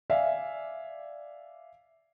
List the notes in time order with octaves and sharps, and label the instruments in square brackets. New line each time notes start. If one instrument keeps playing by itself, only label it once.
[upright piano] D5 E5 F5 G#5